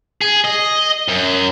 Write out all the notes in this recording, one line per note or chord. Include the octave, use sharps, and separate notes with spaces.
G#4
D#5
F#2